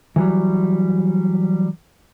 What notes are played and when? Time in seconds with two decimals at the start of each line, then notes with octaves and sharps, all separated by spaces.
0.16 E3 F#3 G3